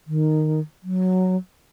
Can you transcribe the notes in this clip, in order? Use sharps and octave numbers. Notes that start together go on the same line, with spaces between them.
D#3
F#3